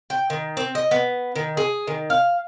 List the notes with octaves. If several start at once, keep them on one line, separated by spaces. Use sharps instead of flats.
G5
D#3
C4
D#5
B3
D#3
G#4
D#3
F5